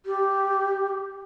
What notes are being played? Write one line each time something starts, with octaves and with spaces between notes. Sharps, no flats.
G4